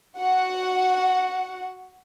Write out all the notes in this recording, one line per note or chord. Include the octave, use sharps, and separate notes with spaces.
F#4 F#5